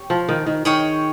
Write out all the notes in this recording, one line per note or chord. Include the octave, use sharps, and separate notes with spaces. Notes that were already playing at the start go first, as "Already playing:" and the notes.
Already playing: G4 C#5
F3
D#3
D#3
D#3 G#4 C#5 G5